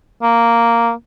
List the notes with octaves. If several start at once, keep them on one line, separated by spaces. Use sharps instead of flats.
A#3